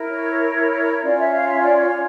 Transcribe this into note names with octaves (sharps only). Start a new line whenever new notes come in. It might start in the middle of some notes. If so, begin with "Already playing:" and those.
Already playing: E4 A#4
C#5
C#4 F4 C#5 D5
E5
F5
E5
D5
C#5